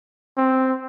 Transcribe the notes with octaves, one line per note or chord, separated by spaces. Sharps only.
C4